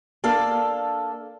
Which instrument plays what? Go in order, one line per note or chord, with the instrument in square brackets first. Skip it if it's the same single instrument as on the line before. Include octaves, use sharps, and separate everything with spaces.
[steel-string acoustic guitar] A#3 D4 A4 F5